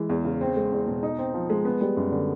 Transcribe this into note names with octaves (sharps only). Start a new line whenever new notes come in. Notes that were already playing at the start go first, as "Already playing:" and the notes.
Already playing: E3 G#3
E2
C#3
C4
G#3
E2
B2
D#4
C4
F3
G#3
B3
G3
F#2
D3